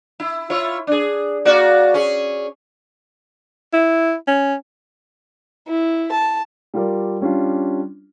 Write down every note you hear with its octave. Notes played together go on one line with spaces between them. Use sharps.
E4
E4 F4 C#5
D4 G#4
A#3 F#4 D5
C#4 G#4
E4
C#4
E4
A5
G3 F4 A#4 D5
G3 C#4 D4 F4